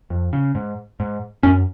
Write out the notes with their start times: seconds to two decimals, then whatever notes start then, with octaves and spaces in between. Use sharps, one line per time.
0.10 F2
0.33 C#3
0.55 G#2
1.00 G#2
1.43 F#2 C#4